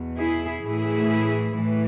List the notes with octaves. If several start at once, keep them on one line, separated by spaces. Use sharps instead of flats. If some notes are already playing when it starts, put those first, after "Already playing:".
Already playing: E2 B2
E4 G#4
A2 E3 E4 G#4
A2 E3